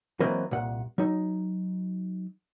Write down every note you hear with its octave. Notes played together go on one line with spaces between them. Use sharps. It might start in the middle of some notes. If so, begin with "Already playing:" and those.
E3 F#3 A#3 C4 B4 D#5
C2 A#2 F#5
F#3 D#4